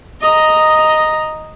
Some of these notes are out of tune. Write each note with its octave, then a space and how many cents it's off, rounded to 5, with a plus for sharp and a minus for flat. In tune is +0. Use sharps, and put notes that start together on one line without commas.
D#5 +0 A#5 +0